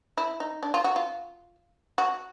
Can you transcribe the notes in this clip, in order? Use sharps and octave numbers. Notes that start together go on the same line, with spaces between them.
E4
D#4
D4
F4
F#4
F4
F#4